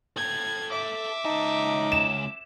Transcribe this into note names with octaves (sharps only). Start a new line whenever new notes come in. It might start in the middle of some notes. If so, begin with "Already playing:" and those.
A4 G5 G#6
E5 D6
C#2 D#4 A5
E7